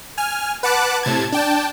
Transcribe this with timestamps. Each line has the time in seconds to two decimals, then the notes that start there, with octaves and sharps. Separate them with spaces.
0.18 G#5 F6
0.63 B4 F#5 A5 D6 F#6
1.03 A2 C3 A5 G#6
1.32 D4 G5 A5